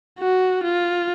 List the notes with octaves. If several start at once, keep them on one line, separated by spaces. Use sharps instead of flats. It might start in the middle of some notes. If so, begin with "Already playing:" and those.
F#4
F4